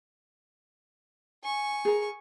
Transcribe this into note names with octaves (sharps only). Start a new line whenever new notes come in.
G#5 C#6
G#4 A#4